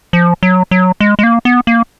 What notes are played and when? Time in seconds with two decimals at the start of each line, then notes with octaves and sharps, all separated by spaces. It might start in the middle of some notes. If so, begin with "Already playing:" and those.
0.13 F3
0.43 F#3
0.71 F#3
1.01 G#3
1.19 G#3
1.23 A#3
1.45 B3
1.67 A#3